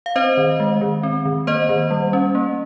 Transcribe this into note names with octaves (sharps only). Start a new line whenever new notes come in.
F5
C4 C5 D#5
D#3
G#3
D#3
C4
D#3
A#3 C5 D#5
D#3
G3
C#4
A#3